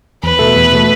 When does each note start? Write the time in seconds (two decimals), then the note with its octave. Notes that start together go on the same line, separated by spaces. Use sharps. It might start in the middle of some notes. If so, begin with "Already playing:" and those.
0.23 E2 B4
0.39 B2 A3
0.56 E2
0.72 B2 A3